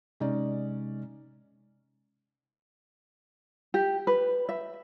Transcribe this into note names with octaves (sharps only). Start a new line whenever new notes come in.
C3 G#3 C#4 D#4 D5
G4
B4
E5